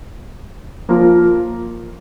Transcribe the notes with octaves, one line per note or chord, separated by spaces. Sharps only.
F3 A#3 F4 A#4